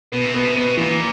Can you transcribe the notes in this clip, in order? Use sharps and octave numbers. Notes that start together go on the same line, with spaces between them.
B2 B3
C3
B2 B3
C3
B2 B3
A#2 E3